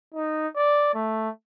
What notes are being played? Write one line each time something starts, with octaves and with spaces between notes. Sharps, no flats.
D#4
D5
A3